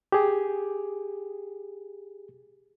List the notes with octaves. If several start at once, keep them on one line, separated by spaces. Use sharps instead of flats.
G4 G#4